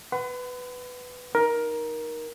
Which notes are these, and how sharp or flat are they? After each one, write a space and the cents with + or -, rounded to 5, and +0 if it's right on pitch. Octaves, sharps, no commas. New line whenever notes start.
B4 +10 F#5 +20 B5 +45
D#4 +0 A#4 +15